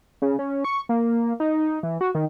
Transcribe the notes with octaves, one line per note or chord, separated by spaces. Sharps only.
C#3
C#4
C#6
A#3
D#4
E3
F#4
D#3